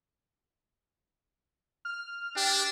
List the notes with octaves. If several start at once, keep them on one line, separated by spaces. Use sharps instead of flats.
F6
D4 G4